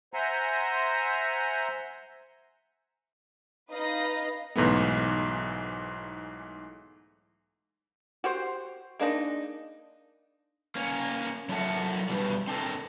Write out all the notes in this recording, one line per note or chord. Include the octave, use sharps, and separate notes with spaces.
C5 E5 F#5 G#5 A#5 C6
D#4 B4 D#5 F5 A#6
B1 G#2 E3 A3 B3
F#4 G4 C5
G#3 A#3 D4 D#4
A#3 C#4
F#3 E4 A4 A#4 E5 F#5
G2 B2 E3 G3
C4 D4 A4 A#4